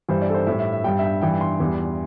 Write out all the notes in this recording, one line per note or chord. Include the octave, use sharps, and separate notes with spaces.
G2 E3 G3 C5
D5
A4
C5
A2 G3 E5
E5
E5
G2 G3 G5
E5
G5
G2 E3 G3 G5
C6
E2 E3 G3